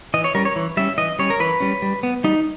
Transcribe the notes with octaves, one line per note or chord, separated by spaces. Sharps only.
E3 D#5
C#5
G3 C#4 A#4
C#5
E3
G3 C#4 E5
E3 D#5
G3 C#4 C#5
A#4
E3 B4
G3 C#4
G3
B3
G3 D#4